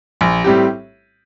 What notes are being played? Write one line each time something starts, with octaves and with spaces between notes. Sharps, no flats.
A#1
A2 G3 C4 G4